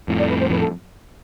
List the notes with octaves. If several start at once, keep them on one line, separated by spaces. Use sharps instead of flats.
F2 A2
D5
B4
C5
F2 A2 B4
A4